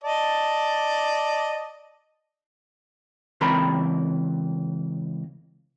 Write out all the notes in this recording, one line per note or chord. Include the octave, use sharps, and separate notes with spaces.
D5 D#5 A5
C#2 E3 C4 A#4 A#5 B5